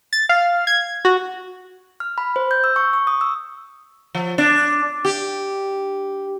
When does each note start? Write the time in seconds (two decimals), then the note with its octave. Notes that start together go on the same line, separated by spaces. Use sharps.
0.13 A6
0.29 F5
0.67 G#6
1.05 F#4
2.00 F6
2.18 B5
2.36 C5
2.51 G6
2.64 E6
2.76 C#6
2.93 C#6
3.07 D#6
3.21 E6
4.15 F3
4.38 D4
5.05 G4